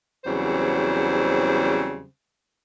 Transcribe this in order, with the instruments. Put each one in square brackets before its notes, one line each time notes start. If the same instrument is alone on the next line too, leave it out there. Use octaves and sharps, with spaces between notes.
[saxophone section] E2 C#3 F#3 G3 C4 C5